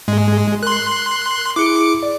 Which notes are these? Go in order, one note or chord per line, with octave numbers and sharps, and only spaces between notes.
G#2 G#3
A#4 C6 F#6
E4 G#4 D6 C#7
D5